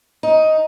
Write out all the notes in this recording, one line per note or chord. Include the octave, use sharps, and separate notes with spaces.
D#4